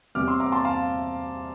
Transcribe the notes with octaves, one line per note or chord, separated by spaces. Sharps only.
E2 C3 G3 C4 D6 F6
C6 E6
A#5 D6
A5 C6
F5 A5